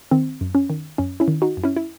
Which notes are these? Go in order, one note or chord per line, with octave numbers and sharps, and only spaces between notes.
D#3 C4
F#2
C#4
D#3
F#2 C#4
C#4 E4
D#3
D#4 F#4
F#2
C#4 E4
E4